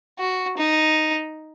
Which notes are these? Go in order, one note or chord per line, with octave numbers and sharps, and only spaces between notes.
F#4
D#4